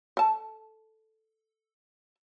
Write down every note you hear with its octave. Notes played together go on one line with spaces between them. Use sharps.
A4 A5